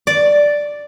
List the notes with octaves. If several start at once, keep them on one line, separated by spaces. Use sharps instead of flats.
D5